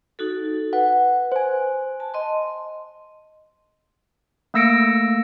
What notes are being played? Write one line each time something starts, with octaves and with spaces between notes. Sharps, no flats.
D#4 F#4 A4
B4 F#5
C5 G#5
A5
D#5 C6
A3 A#3 E6 A#6 C#7 D7